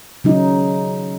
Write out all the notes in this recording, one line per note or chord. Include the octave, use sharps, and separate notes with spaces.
C#3 F#3 D#4